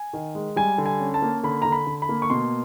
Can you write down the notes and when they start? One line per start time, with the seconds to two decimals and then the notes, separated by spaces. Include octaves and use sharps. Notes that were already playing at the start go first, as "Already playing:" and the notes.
Already playing: G#5
0.13 D#3
0.35 G#3
0.56 G3 G#5
0.78 D3
0.86 G#5
1.00 C#4
1.14 A5
1.22 A#3
1.43 D3 B5
1.62 D3 A#5
1.72 B5
1.87 D3
2.02 B5
2.09 A#3
2.22 C#6
2.30 B2 C6